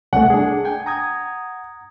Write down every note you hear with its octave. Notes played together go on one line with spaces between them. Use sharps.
C2 A3 F#5
D4 G#4
G5 G#5
A#5 D#6 G#6